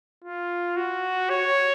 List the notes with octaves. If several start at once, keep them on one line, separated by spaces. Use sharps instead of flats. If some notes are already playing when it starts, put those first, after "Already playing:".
F4
F#4
C#5